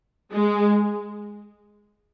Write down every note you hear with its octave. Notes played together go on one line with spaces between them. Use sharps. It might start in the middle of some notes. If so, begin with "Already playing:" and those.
G#3